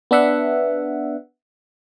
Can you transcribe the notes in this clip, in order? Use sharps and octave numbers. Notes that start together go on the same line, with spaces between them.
B3 D4 E5 F#5